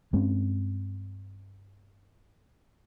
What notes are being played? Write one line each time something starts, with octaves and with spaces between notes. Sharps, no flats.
G2 G#3 C4 C#4